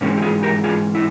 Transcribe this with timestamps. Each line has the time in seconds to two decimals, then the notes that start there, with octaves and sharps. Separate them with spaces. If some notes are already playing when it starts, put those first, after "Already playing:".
0.01 G#2 E3 G#3 A#3 C#4
0.17 G4
0.22 F4 G#4
0.43 G4 A#4
0.64 F4 G#4
0.95 E4